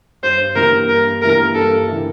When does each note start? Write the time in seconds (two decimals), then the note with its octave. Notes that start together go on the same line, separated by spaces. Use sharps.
0.23 G2 C5
0.56 E3 A#3 E4 G4 A#4
0.88 G2 A#4
1.22 E3 A#3 E4 G4 A#4
1.55 G2 A4
1.88 E3 A#3 E4 G4